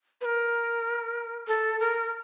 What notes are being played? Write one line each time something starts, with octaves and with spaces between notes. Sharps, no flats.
B4
A#4
A4
A#4